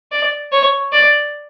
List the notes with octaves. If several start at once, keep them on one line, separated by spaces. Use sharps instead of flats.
D5
C#5
D5